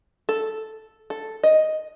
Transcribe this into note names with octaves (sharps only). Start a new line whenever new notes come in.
A4
A4
D#5